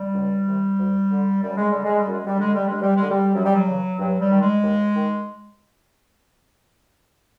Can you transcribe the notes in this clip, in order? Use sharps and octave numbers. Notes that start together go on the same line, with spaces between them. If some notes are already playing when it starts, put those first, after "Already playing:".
Already playing: G3
C#2
C3 D#3
D2
D3
F#2 G3
G#3
D3 G3
G#3
G3
F#2 G#3
G3
D3 G#3
G3
G2 G#3
G3
G#3
D3
G3
F#2 F#3
G3
F#3
C#3 E3
G2 F#3
G3
D#3
G#3
D#2
D#3